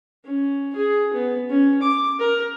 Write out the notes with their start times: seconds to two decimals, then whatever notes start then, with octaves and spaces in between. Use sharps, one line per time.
0.25 C#4
0.76 G#4
1.13 B3
1.50 C#4
1.82 D6
2.20 A#4